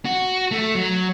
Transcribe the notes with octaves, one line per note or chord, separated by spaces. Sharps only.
F#4
A3
F#3